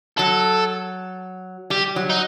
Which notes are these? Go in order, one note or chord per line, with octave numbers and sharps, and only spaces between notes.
F#3 A4
G3 G4
F#3
D#4